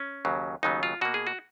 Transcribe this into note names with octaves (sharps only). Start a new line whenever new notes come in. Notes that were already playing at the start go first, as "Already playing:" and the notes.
Already playing: C#4
D#2 C#3 F#3
D#2 C#3 F#3 B3 D#4
F4
B2 A#3 F#4
G#4
F#4